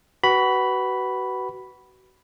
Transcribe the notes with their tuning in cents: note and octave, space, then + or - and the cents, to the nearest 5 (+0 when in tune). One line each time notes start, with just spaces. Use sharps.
F#4 +30 B4 +0 B5 +0